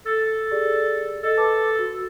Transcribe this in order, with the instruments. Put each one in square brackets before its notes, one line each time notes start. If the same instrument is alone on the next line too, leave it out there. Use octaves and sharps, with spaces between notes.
[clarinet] A4
[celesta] G4 G#4 D5
[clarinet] A4 [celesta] D#5
[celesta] B4 A5 D6
F#4 E6